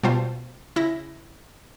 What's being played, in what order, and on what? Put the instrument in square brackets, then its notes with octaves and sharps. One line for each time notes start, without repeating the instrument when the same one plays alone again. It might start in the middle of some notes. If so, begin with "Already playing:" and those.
[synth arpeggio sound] B2 G3 F4 C5 A5
C#3 E4 A#6